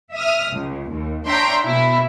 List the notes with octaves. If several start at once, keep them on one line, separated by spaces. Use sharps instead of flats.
E5 D#6 F6
C#2
D#2
D4 C#5 E5 G5 A#5 C6
B2 E4